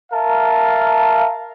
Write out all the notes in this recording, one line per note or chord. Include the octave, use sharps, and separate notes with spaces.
A#4 E5 F5 A5